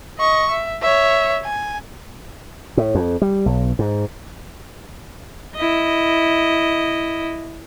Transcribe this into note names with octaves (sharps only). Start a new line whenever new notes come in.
D#5 C#6
E5
C#5 E5
G#5
A2
F2
G3
B1
G#2
E4 D#5